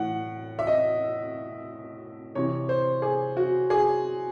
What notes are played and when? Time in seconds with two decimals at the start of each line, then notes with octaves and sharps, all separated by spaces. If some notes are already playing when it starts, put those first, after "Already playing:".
Already playing: A2 E3 F#5
0.59 E5
0.67 D#5
2.35 C3 E3 C#5
2.69 C5
3.02 G#4
3.37 F#4
3.70 G#4